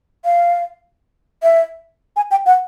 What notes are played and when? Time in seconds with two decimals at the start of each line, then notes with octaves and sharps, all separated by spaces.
0.25 F5
1.43 E5
2.16 G#5
2.31 G5
2.46 F#5